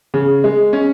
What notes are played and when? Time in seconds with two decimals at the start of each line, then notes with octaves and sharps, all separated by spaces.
0.14 C#3
0.44 G#3
0.73 C#4